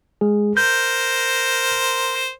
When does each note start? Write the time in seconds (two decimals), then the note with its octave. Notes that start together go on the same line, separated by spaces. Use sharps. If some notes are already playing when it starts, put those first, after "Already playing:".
0.21 G#3 G#4
0.57 A#4 C5 G6